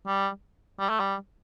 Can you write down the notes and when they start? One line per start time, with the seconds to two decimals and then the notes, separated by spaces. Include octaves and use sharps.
0.07 G3
0.79 G3
0.89 A3
1.00 G3